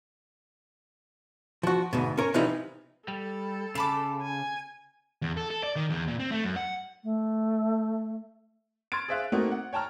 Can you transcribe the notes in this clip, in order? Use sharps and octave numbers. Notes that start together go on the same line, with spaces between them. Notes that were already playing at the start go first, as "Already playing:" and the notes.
F3 F#4
D2 G#2 B2
C#4 A#4 C#5
C3 E3 F3 G3 D#4 E4
G3 A4
C#3 A5 B5 D6
G#5
E2
A4
A4
D5
D#3
E2
A#2
C4
A3
F#2
F#5
A3
C6 F6 G#6 A6 D7
G#4 C5 E5 F5 F#6
A3 A#3 C4 D#4 F#4
F#5
C#5 G5 A5 A#5 F6